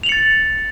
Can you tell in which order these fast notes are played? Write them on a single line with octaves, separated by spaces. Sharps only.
F7 F#7 C#7 A6